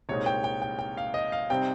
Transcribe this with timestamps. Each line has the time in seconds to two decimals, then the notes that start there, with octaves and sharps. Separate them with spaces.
0.09 C2 A#2 G#3 C4 D#4 C#5
0.26 G5
0.44 G5
0.62 G5
0.79 G5
0.97 F5
1.14 D#5
1.32 F5
1.50 C3 G3 C4 D#4 G5